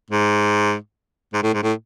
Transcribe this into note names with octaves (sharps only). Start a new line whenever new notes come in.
G#2
G#2
A2
G#2
A2